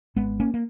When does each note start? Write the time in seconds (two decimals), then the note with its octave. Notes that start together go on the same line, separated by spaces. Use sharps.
0.16 G#1 G#3 B3
0.40 A#3 C#4
0.54 A#3